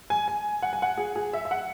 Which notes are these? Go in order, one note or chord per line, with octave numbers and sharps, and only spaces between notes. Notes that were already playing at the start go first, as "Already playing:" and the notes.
G#5
G#5
F#5
G#5
F#5
G#4
G#4
E5
E5
F#5